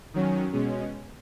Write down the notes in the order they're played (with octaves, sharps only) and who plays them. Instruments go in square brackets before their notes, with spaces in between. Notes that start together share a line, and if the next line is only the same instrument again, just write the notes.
[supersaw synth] D#3 F#3 C#4
B2 G#3 C#4